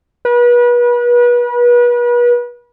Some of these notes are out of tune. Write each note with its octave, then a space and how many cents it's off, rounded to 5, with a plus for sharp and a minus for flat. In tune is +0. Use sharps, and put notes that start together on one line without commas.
B4 -35